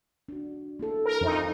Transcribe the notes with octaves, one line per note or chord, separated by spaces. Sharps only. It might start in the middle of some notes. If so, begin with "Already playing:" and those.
D4 F#4
A#3 E4 A4
A#4
F2 D#4